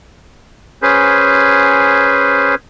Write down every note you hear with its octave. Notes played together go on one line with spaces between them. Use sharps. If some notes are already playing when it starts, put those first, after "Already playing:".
C#4 G#4 B4 C5